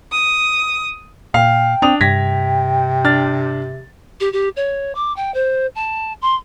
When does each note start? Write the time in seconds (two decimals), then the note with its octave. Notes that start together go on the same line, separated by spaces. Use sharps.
0.11 D#6
1.34 A#2 F5 G5
1.82 C4 D4 D#6 F7
2.01 G2 C3 G5 G#6 A#6 B6
3.05 D4 F6 A6
4.20 G4
4.33 G4
4.56 C#5
4.95 D6
5.16 G5
5.34 C5
5.75 A5
6.22 C6